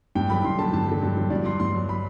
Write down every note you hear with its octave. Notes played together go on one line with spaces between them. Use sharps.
G2 G5
D3 F#3 B5
G2 C6
D3 F#3 A5
G2 A5
D3 F#3
G2
D3 F#3
G2 D5
F#3 C6
G2 C6
F#3
B5